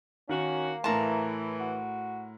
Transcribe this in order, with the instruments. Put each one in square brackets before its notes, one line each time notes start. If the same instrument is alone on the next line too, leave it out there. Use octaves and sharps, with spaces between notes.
[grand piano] D#3 [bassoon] A#3 [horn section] C#4 F#4
[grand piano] A2 A#4 C6 [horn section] E3 [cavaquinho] A5 A#5
[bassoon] F#4